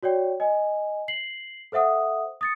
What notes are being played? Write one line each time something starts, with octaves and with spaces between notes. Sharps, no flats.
F#4 C#5 D5 G5
D#5 G#5
C7 F#7
A4 C5 E5 F#5 D#6
D#6 A6 C#7